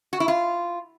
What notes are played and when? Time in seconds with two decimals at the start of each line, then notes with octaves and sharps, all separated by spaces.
0.13 F#4
0.20 E4
0.28 F4